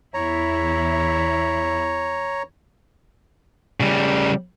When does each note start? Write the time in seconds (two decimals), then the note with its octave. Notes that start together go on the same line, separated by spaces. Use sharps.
0.14 E2 E4 C#5 A#5
3.80 C#3 G3